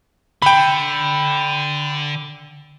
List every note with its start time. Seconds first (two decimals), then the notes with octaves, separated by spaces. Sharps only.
0.42 D3 G5 B5